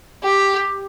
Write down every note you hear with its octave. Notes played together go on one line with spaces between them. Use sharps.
G4